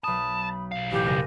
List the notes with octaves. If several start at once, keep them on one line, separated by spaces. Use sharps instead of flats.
B1 A5 B5 D#6
B1 F5
A1 G4
F#1 A#6 D#7